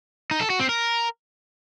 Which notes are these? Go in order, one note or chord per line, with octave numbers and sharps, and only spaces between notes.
D#4
A4
F#4
C4
A#4